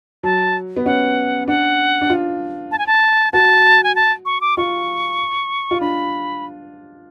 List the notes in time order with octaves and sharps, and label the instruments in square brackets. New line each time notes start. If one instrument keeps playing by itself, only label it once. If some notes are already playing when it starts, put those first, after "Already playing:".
[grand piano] F#3 [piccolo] A5
[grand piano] B3
[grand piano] C#4 [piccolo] F#5
[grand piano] D4 [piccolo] F#5
[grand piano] D4
F4
[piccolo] A5
G#5
A5
[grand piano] F#4 [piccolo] A5
[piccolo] G#5
A5
C#6
D6
[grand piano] F4 [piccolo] C#6
[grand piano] F4
[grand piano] D4 [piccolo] B5